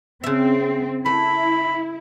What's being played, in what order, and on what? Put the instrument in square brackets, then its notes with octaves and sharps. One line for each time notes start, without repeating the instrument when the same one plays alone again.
[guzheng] C#3 E5 [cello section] C4
[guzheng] A3 [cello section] E4 [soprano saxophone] B5